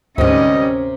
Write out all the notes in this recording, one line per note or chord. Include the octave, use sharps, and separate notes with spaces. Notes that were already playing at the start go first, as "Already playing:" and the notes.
D2 G#2 C3 G3 C#4 A#4 D#5